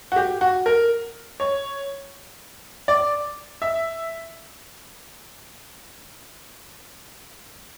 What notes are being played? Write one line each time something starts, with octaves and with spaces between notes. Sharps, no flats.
F#4
G4
F#4
A#4
C#5
D5
E5